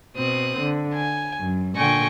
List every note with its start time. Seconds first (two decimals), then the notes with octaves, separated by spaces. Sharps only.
0.16 B2 C4 D#6 F#6
0.59 D3
0.94 G#5
1.40 F#2
1.76 A#2 D3 G5 G#5 C#6 A#6